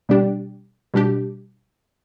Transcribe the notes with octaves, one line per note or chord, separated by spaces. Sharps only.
B2 G3 D4 G4
B2 G3 D4 G4